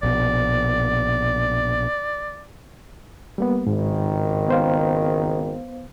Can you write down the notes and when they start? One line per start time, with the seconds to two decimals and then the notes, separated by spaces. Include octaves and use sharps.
0.03 A#1 B2 D5
3.38 G3 A#3 B3
3.67 G#1 C#2 G#2 D#3
4.48 B3 C5 F5